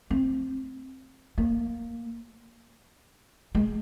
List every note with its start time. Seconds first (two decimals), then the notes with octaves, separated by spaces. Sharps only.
0.10 C4
1.38 A#3
3.55 G#3